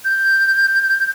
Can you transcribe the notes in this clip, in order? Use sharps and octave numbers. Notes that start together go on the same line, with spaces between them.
G6